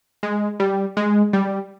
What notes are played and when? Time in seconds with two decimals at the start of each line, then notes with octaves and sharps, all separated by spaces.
0.23 G#3
0.60 G3
0.97 G#3
1.33 G3